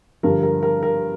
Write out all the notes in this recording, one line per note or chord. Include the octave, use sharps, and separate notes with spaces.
G2 D3 F3 A#4
A#4
A#4
A#4